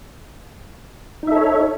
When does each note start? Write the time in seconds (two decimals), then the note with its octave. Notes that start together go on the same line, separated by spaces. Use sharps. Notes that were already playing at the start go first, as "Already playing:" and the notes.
1.23 D#4
1.27 E5
1.32 A4
1.36 C#5